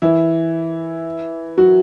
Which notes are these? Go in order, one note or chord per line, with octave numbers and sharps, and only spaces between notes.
E3 E4
F#3 F#4